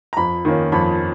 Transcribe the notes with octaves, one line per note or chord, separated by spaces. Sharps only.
A#5
F2 B5
D#3 A#3 C#4
F2 B5